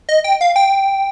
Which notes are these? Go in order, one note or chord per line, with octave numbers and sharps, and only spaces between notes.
D#5
G5
F5
G5